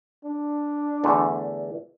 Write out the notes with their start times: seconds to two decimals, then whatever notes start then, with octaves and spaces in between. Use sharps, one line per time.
0.25 D4
1.04 E2 D3 A3